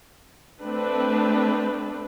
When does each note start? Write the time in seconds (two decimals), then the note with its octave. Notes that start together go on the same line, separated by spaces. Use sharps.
0.62 A3 C4 D4 B4